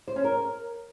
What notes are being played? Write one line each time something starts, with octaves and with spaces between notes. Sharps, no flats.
C5
C#4
A#4